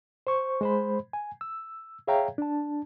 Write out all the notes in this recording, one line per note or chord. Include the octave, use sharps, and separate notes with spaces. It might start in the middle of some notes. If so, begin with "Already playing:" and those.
C5 C#6
G#3 C5 B5
G#5
E6
G#4 C#5 E5 F5 G5 A#5
D4 A5